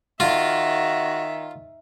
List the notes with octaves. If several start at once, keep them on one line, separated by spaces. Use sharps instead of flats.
D#3 F4 F#4 E5